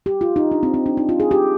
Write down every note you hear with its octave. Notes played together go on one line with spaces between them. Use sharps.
G4
F4
D#4
D4
C4
C4
D4
D#4
F4
G#4
G4